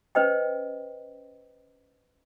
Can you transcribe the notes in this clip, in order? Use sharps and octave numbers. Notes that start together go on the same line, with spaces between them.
C#4 B4 C5 D#5 G5